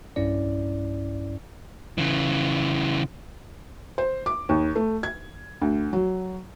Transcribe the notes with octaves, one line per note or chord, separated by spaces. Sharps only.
B1 G2 C#4 E4 D5
C#3 E3
C5
D6
D#2
A3
G#6
D2
F#3